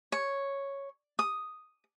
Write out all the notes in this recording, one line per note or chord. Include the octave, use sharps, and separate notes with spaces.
C#5
D#6